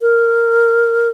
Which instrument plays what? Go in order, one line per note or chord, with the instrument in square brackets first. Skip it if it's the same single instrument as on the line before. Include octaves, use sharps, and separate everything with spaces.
[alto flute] A#4